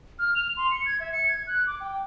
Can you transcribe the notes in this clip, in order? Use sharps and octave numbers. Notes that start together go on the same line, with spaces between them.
F6
F7
C6
C#7
G#6
E5
C#7
G#6
F#6
D6
G5